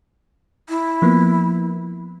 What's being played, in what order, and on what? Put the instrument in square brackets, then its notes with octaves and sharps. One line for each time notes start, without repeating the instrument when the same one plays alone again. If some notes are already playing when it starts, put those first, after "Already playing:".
[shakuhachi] E4
[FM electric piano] F3 A#3 B3